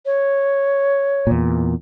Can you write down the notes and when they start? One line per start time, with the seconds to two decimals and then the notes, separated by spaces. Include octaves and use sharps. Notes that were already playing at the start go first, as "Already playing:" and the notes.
0.05 C#5
1.27 E2 A#2